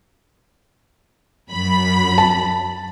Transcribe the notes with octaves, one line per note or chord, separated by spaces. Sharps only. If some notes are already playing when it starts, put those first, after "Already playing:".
F#2 B5
A5